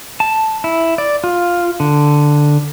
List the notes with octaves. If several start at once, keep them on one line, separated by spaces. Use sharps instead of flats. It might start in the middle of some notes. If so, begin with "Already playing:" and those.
A5
E4
D5
F4
D3